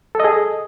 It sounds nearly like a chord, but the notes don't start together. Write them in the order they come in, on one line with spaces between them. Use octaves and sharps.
A4 D#5 G#4